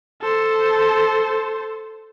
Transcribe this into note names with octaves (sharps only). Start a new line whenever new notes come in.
A4 C5